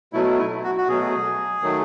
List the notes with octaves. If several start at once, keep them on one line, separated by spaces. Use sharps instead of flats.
B2 F#3 A3 E4
E4
F#4
F#4
B2 F#3 A3 G#4
D#3 F#3 A3